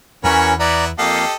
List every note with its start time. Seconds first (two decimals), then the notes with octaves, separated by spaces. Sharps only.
0.24 E2 E3 C#4 F#4 A#4 C#5 B5
0.60 B3 E4 D5 A#5
0.98 F2 A#3 G4 A4 D#5 F5